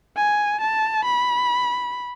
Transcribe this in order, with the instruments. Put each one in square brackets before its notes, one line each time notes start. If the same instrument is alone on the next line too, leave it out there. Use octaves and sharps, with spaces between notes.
[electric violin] G#5
A5
B5